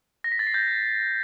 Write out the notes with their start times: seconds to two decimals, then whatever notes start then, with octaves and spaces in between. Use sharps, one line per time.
0.24 A#6
0.32 B6
0.39 A6
0.47 C7
0.54 G6